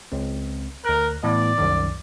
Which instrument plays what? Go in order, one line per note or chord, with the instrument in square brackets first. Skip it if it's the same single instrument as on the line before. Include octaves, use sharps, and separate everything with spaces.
[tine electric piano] C#2 C4
[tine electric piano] D2 F#6 [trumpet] A#4
[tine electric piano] A2 E3 B3 [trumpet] D5
[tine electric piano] C2 F#2 D#3